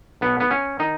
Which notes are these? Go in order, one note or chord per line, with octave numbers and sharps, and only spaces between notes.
B1 B2 B3
B3
C#4
D#3 D#4